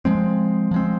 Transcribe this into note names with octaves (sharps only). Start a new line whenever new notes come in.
F3 G#3 C4
F3 G#3 C4